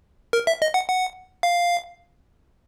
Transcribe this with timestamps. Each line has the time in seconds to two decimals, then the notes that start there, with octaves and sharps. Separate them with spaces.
0.33 A#4
0.47 E5
0.62 D#5
0.74 F#5
0.89 F#5
1.43 F5